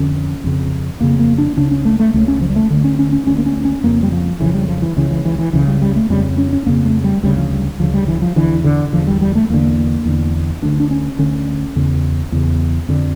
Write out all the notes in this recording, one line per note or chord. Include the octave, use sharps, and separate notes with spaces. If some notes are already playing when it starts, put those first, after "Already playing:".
Already playing: F2 D3 C#4
F2 C#3
F2 C#3 A#3
A#3
D4
C#2 C#3 D4
C#4
A3
A3
C#2 C#3 A3
C#4
F3
G3
A3
D2 D3
C#4
C#4
C#4
D2 D3 C#4
A#3
C#4
C#4
F2 C#3 A#3
G3
F3
F2 C#3 E3
G3
F3
E3
C#2 C#3 E3
E3
E3
E3
C#2 C#3 E3
G3
G3
A3
F2 C#3 G3
C#4
C#4
F2 C#3 A#3
A3
G3
D2 C#3 G3
F3
G3
D2 C#3 F3
G3
E3
F3
E2 D3 E3
D3
E2 D3 F3
G3
G3
A3
E2 D3 A#3
E2 D3
D2 D3 D4
D4
C#4
D2 D3 C#4
E2 C#3
E2 C#3
F2 D3